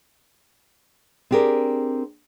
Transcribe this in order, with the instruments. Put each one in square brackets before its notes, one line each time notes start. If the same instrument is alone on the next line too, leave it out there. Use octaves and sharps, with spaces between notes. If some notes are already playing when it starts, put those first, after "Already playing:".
[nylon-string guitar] C4 D4 G4 G#4 A#4